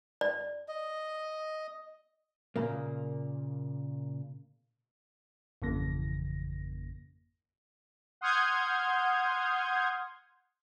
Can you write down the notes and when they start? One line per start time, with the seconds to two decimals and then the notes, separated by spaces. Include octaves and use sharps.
0.21 D5
0.68 D#5
2.56 A#2 C#3 A#3
5.62 G#1 F2 C#3 E3 A#3 A#6
8.21 F#5 C6 D#6 F6 G6 G#6